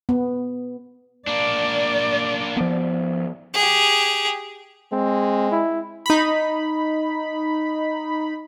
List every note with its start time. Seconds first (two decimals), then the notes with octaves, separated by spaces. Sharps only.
0.09 B3
1.27 A#3 D4 D5
2.57 F3 B3
3.54 G4 G#4
4.92 G#3 C4
5.51 E4
6.06 D#4 B5